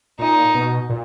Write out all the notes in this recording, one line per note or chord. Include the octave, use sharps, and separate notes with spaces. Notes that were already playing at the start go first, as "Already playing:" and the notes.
A#2 D#4
B2
A#2